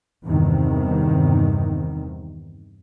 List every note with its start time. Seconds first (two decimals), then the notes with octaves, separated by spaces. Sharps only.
0.24 E2 G2 C3 D#3